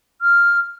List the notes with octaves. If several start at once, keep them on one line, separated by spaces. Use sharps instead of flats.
F6